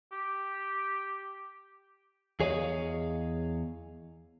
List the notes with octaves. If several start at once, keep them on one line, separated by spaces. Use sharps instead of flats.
G4
E2 G#4 C#5 D#5 F5